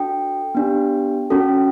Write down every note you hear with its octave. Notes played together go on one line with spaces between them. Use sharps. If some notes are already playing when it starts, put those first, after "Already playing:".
Already playing: D4 F#4 A4 G5
B3 D4 G4
C#4 F#4 A4